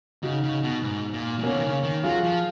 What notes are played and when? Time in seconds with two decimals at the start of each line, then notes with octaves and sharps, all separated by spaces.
0.23 C#3 D#4 F#4
0.43 C#3
0.63 B2
0.83 G#2
1.13 A#2
1.39 A#2
1.43 B2 A#3 C#4
1.53 D#3
1.63 C#3
1.83 D#3
2.03 F#3 F4 G#4
2.24 F3